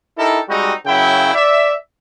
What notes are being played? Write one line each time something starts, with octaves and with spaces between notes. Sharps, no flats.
D#4 E4 G4 A4 A#4
G3 G#3 C4 D#4 F#4
F#2 C#3 F#3 E4 G5
D5 E5